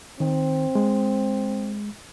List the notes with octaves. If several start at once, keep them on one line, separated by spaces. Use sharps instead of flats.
D#3 C4
G#3